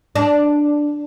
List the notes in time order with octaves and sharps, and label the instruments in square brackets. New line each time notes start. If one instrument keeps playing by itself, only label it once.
[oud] D4